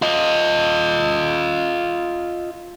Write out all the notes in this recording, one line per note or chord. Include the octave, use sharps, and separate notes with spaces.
F4 D#5